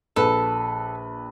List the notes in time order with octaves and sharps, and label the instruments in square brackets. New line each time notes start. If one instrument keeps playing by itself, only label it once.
[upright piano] A#1 B4 [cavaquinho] A4